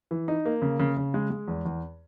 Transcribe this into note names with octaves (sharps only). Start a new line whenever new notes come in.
E3
D#4
A#3
C#3
C#3
C#3
G#3
G#3
E2
E2